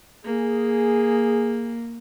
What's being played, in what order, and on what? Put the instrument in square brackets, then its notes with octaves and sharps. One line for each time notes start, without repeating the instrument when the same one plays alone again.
[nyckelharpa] A#3 [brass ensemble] G#4